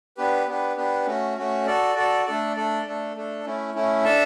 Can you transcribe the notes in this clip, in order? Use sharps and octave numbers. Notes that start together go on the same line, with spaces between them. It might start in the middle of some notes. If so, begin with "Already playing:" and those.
B3 D4 G4 B4
B3 D4 G4 B4
B3 D4 G4 B4
A3 C#4 F#4
A3 C#4 F#4
F#4 A4 D5
F#4 A4 D5
A3 D4 A4 D5
A3 D4 A4 D5
A3 D4 A4
A3 D4 A4
A3 C#4 E4
A3 C#4 E4
D4 A4 E5 A5